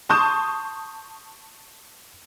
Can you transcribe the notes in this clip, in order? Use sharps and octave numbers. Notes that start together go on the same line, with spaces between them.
A5 C6 C#6 D#6 G6 E7